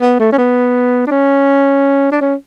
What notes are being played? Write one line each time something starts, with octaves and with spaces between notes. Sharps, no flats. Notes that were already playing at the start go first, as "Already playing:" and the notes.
B3
A3
C#4
B3
D4
C#4
D4
C#4